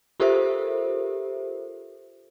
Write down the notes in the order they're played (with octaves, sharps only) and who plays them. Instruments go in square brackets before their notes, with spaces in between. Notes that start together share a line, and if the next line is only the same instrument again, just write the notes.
[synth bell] F4 G4 A4 A#4 C5 E5